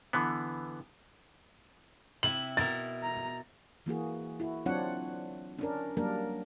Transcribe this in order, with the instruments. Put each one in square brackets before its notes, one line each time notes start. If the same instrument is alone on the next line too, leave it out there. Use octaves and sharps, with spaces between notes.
[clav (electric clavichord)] D3 E3 B3
[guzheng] C3 E4 B5 [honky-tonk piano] F#7
[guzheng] B2 E4 A#4 [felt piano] A6
[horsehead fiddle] A#5
[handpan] E3 A#3 F#4 G#4
E4 F#4
F#3 C4 D4 F4 C#5 F#5
C#4 D4 A#4
F#3 G3 A#3 D4 A#4